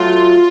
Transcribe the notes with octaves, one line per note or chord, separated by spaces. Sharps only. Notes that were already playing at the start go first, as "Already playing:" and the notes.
Already playing: F#3 A3 F4